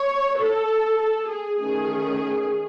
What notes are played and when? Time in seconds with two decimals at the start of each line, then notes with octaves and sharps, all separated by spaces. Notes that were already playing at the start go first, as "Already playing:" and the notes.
Already playing: C#5
0.38 A4
0.99 A4
1.29 G#4
1.59 D#3 A3 C#4 G#4